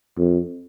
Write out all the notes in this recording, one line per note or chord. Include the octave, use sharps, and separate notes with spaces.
F2